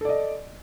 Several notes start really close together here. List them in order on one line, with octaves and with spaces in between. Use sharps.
A4 D5 D#5